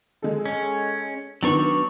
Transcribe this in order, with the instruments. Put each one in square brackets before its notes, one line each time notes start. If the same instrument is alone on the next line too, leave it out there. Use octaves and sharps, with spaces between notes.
[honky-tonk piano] G#3 A4
[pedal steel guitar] C#4
[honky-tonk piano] D#3 B3 C4 [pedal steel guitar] F#3 D4 C#6